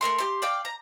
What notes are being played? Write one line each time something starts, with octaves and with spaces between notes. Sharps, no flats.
A3 A#3 A#4 C6
G4 C6
D5 F5 G5
A#5